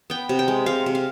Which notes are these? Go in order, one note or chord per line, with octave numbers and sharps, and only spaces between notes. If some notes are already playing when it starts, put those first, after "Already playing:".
B3 G5
C3
G5
G#3
C3 F5
C3
F5